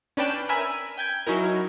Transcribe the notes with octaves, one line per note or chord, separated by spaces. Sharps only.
C#4 D4 B4 D5 G5 E7
A#4 E5 G#5 B5
D#7
G5 G6 G#6
F#3 C#4 D#4 E4 A#4